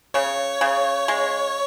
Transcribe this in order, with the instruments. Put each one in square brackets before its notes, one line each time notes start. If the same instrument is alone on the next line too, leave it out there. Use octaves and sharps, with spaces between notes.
[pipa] C#3 [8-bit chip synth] C#5
[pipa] C#3
G#3